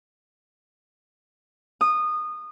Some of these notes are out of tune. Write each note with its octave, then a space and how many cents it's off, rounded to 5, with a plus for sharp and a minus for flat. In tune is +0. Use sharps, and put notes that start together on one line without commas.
D#6 -20